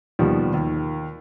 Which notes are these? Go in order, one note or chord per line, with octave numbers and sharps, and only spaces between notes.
D#2 B2 F3 G3
D#2